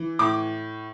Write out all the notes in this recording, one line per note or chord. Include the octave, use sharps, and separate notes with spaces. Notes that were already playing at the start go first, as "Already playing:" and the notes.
Already playing: E3
A2 D6